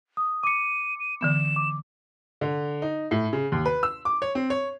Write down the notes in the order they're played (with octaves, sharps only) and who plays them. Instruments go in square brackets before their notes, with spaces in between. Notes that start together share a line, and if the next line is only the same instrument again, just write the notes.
[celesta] D#6
[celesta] D6 C#7 [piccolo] D#7
[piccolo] D#7
[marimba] D3 E3 B3 [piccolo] E7
[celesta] D6
[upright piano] D3
D#4
A2
C#3
D#2
B4
E6
D6
C#5
C4
C#5